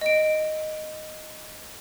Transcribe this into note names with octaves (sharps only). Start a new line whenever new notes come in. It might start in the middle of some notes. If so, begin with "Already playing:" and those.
D#5 D7